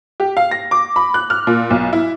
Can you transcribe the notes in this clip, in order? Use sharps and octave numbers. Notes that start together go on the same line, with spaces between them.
G4
F5
A#6
D6
B5
F#6
F6
A#2
B1
E4